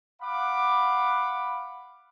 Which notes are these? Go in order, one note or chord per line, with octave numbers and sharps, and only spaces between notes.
F5 F#5 B5 D6